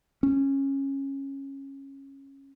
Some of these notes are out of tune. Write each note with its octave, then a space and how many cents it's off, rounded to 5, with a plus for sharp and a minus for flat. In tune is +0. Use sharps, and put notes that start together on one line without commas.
C#4 -15